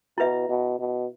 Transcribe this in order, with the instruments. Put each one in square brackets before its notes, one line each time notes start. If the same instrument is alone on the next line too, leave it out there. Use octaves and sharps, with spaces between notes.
[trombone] B2 [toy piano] E4 B4 E5
[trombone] B2
B2